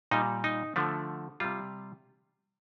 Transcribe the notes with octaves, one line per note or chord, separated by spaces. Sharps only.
A#2 G3 D#4
D#4
D3 F3 A3
C3 G3 F4